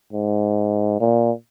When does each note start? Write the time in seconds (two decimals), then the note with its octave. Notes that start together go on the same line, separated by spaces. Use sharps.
0.13 G#2
1.01 A#2